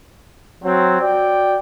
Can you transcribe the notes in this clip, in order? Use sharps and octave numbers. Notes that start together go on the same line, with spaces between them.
F#3 C4
F#4 D5 G5